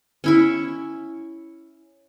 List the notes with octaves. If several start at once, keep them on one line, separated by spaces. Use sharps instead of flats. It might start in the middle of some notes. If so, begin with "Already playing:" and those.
C#4 E4 C#6